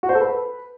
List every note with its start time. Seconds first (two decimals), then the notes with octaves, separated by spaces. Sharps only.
0.03 F#4
0.09 C5
0.15 A4
0.21 B4